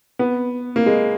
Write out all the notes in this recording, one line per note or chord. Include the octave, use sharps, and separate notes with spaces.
B3
A#3
G#3